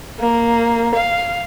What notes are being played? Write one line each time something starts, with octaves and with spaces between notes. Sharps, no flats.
A#3
F5